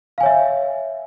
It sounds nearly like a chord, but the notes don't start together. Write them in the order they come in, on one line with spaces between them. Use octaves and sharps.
F5 G#5 C#5 E5